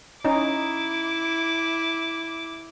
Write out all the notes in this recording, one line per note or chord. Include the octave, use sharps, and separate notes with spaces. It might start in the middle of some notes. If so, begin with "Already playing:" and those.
C#4 D#4 E4 D6